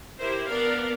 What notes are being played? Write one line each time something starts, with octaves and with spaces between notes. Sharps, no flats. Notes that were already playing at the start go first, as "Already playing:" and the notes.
E4 G4 A#4 C5
B3 D4 A#4 D5 F5